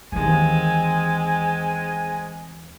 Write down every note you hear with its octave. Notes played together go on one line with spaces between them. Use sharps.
D#2 E3 G#3 C4 G#5